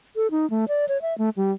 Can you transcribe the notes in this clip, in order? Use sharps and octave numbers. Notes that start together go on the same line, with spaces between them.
A4
D#4
A3
D5
C#5
E5
A3
G3